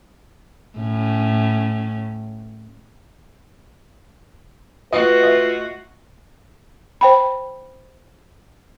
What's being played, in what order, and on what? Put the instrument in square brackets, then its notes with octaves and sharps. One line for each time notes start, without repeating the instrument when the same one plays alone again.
[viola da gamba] A2 C#4
[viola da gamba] A3 F4 F#4 [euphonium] B4 [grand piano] D#5
[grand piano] D#5 E5
[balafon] C5 G5 B5